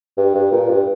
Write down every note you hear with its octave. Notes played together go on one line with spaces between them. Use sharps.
G2
G2
A#2
G2